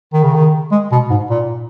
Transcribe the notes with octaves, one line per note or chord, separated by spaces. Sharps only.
D#3
C#3
D#3
G#3
B2
G#2
A#2